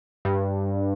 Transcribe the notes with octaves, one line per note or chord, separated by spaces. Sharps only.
G2